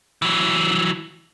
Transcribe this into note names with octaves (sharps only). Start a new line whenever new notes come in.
E3 F#3